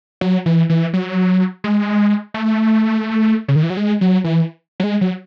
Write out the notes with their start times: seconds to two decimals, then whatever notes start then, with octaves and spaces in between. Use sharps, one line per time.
0.21 F#3
0.46 E3
0.70 E3
0.93 F#3
1.64 G#3
2.34 A3
3.48 C#3
3.56 D#3
3.63 E3
3.70 F#3
3.77 G#3
4.01 F#3
4.24 E3
4.80 F#3
4.84 G#3
5.01 F#3